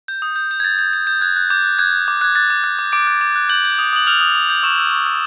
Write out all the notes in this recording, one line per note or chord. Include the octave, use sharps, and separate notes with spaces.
G6
D#6
G6
G6
G#6
G6 A6
G6
G6
G6
F#6 G#6
F#6
D6 G6
F#6
F#6 G#6
F#6
D6
F#6 G#6
F#6 A6
D6
F#6
D6
D6 D7
F#6
D6
F#6
F#6 G6 F#7
G6
D#6
D#6 F#7
F6 G6 F7
D#6
D#6
G6
C#6 E6 E7
E6
C#6
E6